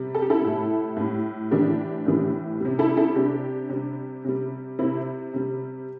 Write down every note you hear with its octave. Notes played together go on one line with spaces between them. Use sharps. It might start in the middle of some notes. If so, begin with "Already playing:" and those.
Already playing: C3 G3
A4
G4
E4 A4
A2 G3
A2 G3
A2 E3 G3 D4 G4
A2 E3 G3
C3 G3
E4 A4
E4 A4
C3 G3 D4 G4
C3 G3
C3 G3
C3 G3 C4 E4
C3 G3